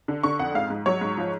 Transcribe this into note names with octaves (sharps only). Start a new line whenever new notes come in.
D3
D3 C#6
F2 F#5
G#2 F5
G#2
F#3 C#5
G#2
F3